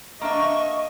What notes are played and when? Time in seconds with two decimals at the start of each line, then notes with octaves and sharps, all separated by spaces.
0.21 A#3 D4 D#5 E5 C#6